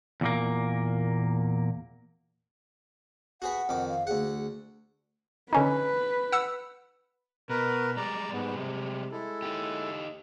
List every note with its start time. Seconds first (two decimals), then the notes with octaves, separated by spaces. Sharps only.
0.21 E2 A#2 A#3
3.42 F#4 G#4 B4 F#5
3.69 F2 D#3 D6
3.89 F5
4.07 D2 G#4 F#5
5.53 D3 C#4 D#4 B4
6.32 F#5 E6
7.49 B2 A#4 B4
7.97 G3 G#3 D5 A#5
8.32 G#2 B3
8.55 C3
9.12 G#3 E4 A4
9.42 D#4 G4